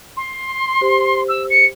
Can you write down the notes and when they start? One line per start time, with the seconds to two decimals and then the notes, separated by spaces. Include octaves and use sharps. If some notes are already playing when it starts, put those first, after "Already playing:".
0.17 C6
0.81 G4 C5
1.28 E6
1.49 C#7